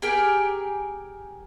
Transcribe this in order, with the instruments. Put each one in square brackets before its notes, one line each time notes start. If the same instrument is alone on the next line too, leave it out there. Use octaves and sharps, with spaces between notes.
[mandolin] G4 G#4 A#4 G5